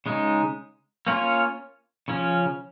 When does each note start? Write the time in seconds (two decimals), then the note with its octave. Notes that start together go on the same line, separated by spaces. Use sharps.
0.06 C#3 G#3 D#4
1.07 A#3 C#4 F4 C#5
2.08 C#3 F3 C#4